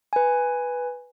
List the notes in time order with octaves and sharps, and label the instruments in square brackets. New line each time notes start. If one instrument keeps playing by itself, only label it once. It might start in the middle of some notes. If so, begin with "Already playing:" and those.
[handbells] B4 G#5